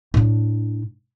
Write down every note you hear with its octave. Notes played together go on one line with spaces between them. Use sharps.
A2 D4